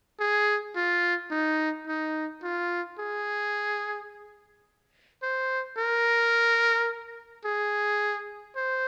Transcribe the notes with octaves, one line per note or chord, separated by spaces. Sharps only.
G#4
F4
D#4
D#4
F4
G#4
C5
A#4
G#4
C5